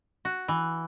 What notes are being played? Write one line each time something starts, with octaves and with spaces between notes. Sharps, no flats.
F#4
E3